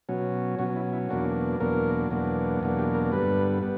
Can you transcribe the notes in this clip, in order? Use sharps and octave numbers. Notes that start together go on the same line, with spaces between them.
B2 F#3 C#4
B2 F#3 C#4 F#4
E4
E4
E2 B2 F#3 A#3 D4 F#4
E2 B2 F#3 A#3 D4 A#4
E2 B2 F#3 A#3 D4
E2 B2 F#3 A#3 D4
G4
A#4
G2 D3 G3 B3 B4
G3 B3